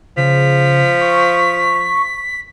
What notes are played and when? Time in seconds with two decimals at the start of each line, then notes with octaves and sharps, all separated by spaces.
0.17 C#3 F3 B6
1.01 C#6